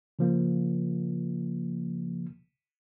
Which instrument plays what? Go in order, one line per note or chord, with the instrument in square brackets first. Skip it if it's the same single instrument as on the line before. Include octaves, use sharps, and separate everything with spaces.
[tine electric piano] C#3 F3 A#3